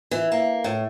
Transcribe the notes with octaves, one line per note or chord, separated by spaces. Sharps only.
E3
A#3
A2